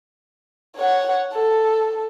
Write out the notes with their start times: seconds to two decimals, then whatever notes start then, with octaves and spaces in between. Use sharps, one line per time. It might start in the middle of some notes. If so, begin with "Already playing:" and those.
0.77 C#5 F#5
1.33 A4